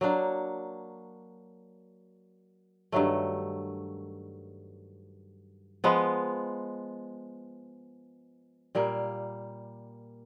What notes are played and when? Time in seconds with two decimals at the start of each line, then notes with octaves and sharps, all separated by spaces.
0.01 F#3 A#3 D4
2.92 G2 D#3 F#3 A3
5.84 F3 G#3 B3
8.75 A#2 G3 A#3